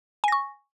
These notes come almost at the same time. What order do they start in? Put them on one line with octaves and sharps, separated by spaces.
G#5 A#6 C#6